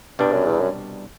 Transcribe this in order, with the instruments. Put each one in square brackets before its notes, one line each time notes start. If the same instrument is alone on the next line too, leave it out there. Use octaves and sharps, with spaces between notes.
[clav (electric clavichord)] C2 B2 G3 D4 [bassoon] G2
[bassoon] F#2
E2
F#2